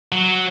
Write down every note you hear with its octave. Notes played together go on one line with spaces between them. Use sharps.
F#3